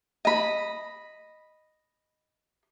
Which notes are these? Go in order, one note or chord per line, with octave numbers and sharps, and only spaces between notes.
D#5 B5